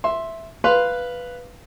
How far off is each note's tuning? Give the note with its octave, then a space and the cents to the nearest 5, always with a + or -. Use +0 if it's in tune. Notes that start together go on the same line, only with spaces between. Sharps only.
E5 +0 C6 +10
B4 +0 F5 -5 C6 -5